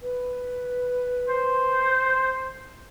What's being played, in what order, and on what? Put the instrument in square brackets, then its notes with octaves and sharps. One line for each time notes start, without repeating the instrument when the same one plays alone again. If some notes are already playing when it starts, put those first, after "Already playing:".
[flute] B4
[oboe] C5